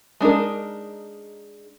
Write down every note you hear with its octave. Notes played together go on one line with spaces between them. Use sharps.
G#3 D4 D#4 A#4